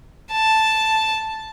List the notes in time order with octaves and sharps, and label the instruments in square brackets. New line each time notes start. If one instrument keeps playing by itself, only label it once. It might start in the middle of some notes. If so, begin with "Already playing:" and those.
[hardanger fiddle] A5